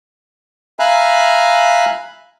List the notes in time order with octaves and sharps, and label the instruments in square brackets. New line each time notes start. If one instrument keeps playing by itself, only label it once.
[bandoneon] E5 F5 G#5 A#5 B5 F#6